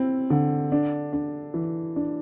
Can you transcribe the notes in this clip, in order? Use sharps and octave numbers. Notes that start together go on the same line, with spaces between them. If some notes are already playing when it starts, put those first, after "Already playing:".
Already playing: C4 E4
D3
D4
D4
E3
D4